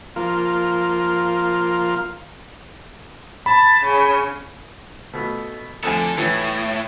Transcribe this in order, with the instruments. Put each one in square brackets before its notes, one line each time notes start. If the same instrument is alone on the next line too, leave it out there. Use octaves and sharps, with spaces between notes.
[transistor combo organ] F3 A#3 F4 A#4
[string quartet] A5 [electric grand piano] B5
[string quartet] C#3
[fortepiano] B2 A3
[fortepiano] F2 A3 G#5 [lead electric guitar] D3 A4
[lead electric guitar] A2 [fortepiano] E3